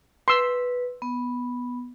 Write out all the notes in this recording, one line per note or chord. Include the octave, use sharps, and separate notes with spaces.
B4 C6 E6
B3